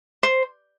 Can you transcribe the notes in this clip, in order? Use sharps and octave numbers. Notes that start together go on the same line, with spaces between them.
C5